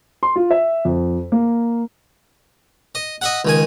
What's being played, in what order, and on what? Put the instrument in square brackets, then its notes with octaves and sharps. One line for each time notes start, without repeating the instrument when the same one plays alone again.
[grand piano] C6
F4
E5
F2
A#3
[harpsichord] D#5
D#5 E5 F#5
C#2 D#3 G#5